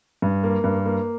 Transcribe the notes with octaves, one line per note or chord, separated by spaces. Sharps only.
G2
A#3
G2
A#3